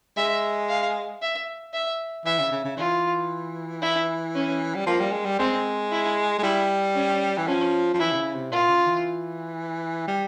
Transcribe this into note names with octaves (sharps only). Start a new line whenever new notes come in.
G#3 E5
F5
E5
E5
E3 E5
C#3
C#3
C#3
E3 F4
E4
C#4
G3
F3 A#3
G3
G#3
G3
G#3 C4
E4
G#3
G3 E4
C#4
E3
F3 C#4
F3
E3 E4
C3
C#3
C3
A#2 F4
C#3
E3
G3